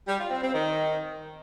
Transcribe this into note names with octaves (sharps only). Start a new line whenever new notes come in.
G3
F4
C4
C4
D#3